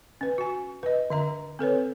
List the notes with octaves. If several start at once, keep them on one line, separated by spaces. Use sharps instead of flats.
C#4 B4
F#4 G#5
B4 D#5
D3 E5 A#5
C4 A4 B4 C#5